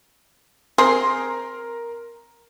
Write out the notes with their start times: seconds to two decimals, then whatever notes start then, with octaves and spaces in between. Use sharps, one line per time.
0.78 C4 G#4 A#4 C6